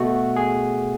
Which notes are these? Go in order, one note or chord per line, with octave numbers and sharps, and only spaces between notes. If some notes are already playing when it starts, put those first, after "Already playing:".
Already playing: B2 A3 F#4
G#4